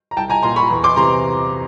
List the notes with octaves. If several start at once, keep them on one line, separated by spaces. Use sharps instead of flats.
A#5
C2 G5 A5
G#5 A#5
A#2 A#5 C6
B5 C#6
E2
C6 D6
C3 E3 A#5 C6